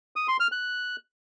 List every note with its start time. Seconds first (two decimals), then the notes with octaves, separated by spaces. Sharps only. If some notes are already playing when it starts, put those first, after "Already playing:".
0.16 D#6
0.28 C6
0.40 F6
0.52 F#6